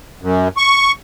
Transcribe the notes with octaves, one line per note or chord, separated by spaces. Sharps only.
F#2
C#6